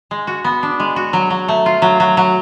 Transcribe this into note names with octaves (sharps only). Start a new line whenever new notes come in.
G#3
F#4
B3
D4
G#3
F#4
F#3
F#3
A3
F4
F#3
F#3
F#3